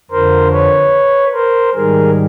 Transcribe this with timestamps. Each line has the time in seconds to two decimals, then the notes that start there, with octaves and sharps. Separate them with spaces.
0.11 F2 D3 F3 A#4 C5
0.52 B4 C#5
1.33 A#4 C5
1.74 G#2 D#3 G3 G#4 A#4